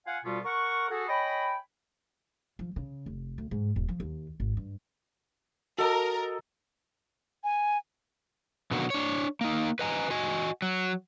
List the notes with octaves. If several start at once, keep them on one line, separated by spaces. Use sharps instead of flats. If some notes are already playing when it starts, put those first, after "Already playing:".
F4 F5 F#5 G#5
D2 B2 G3 B3 F4
A#4 F#5 C#6
F#4 G#4 A4
C#5 D#5 G5 G#5 B5
F3
C#3
F1
D2
G#2
D#1
F3
D#2
G#1
G2
F#4 A4 A#4 D#5
G#5
B2 D3 D#3 F#3 A#3 F#4
D4 C#5
A#3 D#4
B4 D#5 G#5 A#5
F#4 D#5 G#5
F#3